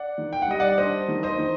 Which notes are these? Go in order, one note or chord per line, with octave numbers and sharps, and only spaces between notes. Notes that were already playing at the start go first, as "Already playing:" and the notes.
Already playing: D5 F#5
D#3
G5
F#5
G3 D#5
D5 F#5
D4 C5 D#5
D#3
C5 D#5
D#3